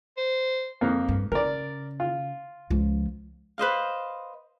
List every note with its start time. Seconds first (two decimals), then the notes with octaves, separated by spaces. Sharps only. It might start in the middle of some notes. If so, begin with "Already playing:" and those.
0.17 C5
0.81 F2 A#3
1.09 G2
1.32 C#3 A#4 D5
2.00 F4
2.70 C#2 F3
3.58 B4 C5 D#5 F5